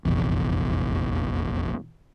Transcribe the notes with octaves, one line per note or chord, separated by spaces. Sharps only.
F1 A#1 E2